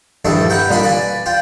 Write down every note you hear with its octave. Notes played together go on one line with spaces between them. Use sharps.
A#1 G2 D#3 E4 A4
B4 F#5 G5 A#5
C2 A#2 D3 D#5 B5 C6
B4 D5 G#5
F4 G5